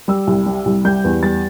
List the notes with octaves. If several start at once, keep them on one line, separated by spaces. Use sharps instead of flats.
G3 E6
C2
G3
C2
G3 G6
E2
G3 A6